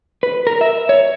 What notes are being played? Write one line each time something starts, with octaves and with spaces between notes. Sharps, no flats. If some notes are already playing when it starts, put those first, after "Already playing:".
B4
A#4
E5
C#5